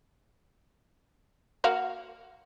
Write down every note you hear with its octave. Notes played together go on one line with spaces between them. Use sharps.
A#3 F#4 F5